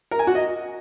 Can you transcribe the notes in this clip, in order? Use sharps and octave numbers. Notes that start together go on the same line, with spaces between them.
A#4
G#5
F#4
D#5